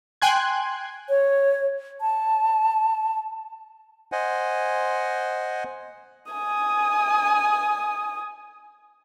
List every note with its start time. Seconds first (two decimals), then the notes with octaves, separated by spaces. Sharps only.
0.22 G5 G#5 C6 F#6 G#6
1.09 C#5
2.01 A5
4.12 C5 D#5 F#5 G#5
6.32 G#5 D#6